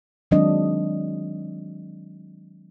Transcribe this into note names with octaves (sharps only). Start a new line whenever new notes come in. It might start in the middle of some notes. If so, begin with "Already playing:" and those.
D#3 F#3 G#3 C4 D4 D#5